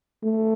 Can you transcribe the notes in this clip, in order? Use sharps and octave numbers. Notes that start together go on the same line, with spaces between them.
A3